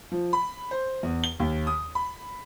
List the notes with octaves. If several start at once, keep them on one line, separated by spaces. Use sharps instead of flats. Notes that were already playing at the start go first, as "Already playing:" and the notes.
F3
B5
C5
E2
G7
D#2
D#6
B5